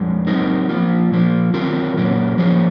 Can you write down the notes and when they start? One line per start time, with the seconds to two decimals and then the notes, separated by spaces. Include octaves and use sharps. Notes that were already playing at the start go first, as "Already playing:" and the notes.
Already playing: F2 G#3
0.27 F#3 C4 D#4 A#4
0.69 F3 A#3 F4
1.11 A#2 F3 A#3
1.53 D#3 F#3 C4 F4 A#4
1.97 A#2 F#3 A#3 C#4
2.38 F3 A#3 C#4 G#4